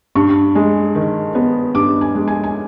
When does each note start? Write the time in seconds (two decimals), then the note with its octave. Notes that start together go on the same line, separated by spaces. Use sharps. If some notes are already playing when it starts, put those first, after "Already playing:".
0.15 G2 C#6
0.55 G#3
0.95 D#3
1.35 B3
1.75 G2 D6
2.01 G#5
2.15 G#3
2.28 G#5
2.44 G#5